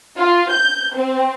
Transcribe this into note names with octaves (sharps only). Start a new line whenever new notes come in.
F4
G6
C4